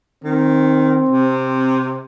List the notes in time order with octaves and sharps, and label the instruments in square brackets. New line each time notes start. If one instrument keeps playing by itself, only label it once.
[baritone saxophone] D#3 [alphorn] C4
[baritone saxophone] C3